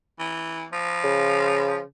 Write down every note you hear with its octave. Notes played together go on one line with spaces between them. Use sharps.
E3
F3
C#3